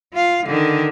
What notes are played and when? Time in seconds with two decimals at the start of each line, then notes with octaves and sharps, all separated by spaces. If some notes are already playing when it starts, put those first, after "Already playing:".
0.13 F4 F5
0.46 D3 D#3